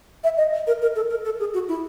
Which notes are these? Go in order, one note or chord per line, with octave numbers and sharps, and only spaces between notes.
E5
D#5
A#4
A#4
A4
A#4
A4
G#4
F#4
E4